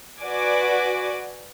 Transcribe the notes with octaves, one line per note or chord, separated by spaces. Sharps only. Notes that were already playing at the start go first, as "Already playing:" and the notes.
F#4 B4 D5 G#5 D6